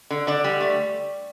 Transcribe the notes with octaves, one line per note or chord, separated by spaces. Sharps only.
D3
D3 D5
G3
A3